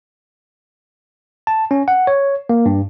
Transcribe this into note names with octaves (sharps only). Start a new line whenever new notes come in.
A5
C#4
F#5
C#5
A#3
G2